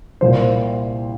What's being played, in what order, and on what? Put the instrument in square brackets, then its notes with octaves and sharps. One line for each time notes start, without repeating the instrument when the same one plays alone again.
[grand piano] C2 A#2 C5